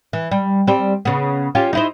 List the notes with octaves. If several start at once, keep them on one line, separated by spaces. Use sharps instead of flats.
E3
G3
G3 C4
C#3 B3
C#4 F4 G4
D#4 E4 C5